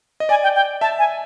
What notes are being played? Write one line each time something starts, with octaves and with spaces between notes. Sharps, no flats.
D#5
D5 G#5
G5
G5
E5 A5
G#5